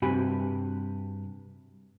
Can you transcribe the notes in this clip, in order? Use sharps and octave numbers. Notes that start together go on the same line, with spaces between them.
G2 C3 F#4 G4 G#5 B5